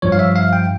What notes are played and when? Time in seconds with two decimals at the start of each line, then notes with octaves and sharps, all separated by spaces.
0.02 G2 F3 C#5
0.12 F5
0.19 E5
0.36 F5
0.53 G5